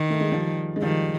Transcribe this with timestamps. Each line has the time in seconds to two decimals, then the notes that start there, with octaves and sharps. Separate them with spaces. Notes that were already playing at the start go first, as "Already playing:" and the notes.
Already playing: D#3 E3
0.10 A3
0.21 G#3
0.32 F3 G3
0.76 G#3
0.82 D#3 F3 G3